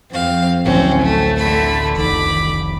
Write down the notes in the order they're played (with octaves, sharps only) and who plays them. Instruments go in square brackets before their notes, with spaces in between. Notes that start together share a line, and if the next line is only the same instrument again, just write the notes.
[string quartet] F2 C4 F5
[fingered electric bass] A1 D2 E3 [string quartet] F#3 C4 C#4
[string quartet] A3
D3 A3 B5
[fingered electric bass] F1 C2 D#3 [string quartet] B5 D6